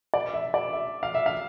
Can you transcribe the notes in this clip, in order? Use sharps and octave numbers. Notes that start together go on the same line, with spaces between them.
D5
E5
D5
E5
F5
E5
F5